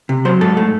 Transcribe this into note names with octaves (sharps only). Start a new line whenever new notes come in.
C3
F#3 C5
G#2 A4
A3